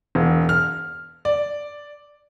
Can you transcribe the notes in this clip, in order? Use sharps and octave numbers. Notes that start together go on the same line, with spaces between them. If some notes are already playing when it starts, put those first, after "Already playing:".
E1
F6
D5